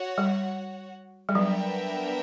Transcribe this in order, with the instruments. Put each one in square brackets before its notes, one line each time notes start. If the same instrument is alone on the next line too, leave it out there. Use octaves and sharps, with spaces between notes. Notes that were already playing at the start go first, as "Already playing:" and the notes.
Already playing: [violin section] F#4 C#5 F#5
[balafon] G3
G3
[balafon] F#3 [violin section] B3 D4 A#4 E5 G5